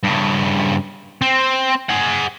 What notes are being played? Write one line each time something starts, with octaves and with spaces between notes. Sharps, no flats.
G2 C#3
C4
G#4 F#5